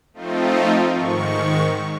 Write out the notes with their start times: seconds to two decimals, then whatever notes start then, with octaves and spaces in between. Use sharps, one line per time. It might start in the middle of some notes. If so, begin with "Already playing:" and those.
0.13 F3 A3 C4 D#4 F4
0.90 G#2 D#3 C#6